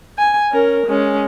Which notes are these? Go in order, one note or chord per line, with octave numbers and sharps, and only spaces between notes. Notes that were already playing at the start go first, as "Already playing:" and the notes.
G#5
C#4 A#4
G#3 C#4